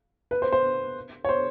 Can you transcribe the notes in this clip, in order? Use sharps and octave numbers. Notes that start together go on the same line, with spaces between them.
B4
C5
C5
C#5
C5